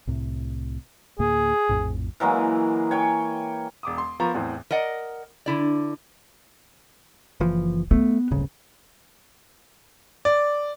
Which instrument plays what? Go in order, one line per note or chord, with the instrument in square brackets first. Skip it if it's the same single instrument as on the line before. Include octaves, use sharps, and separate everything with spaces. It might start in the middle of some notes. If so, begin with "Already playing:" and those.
[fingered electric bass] C2 A2 C3
[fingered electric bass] D2 A2 A#3 [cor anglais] G#4
[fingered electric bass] A#1 F2 A2
[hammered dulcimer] E3 F#3 G#3 A#3
C#5 G5 G#5
[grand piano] E1 D6 D#6
C6
F3 B3 A#4 A#5 C#6
E2 A2 E3 C4
[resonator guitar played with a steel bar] A#4 D5 D#5 F#5 A#5
D3 E4 D5
[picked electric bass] F#1 E3 F3
[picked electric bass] A3 [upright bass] B3
[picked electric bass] D1 G1 C#3
[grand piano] D5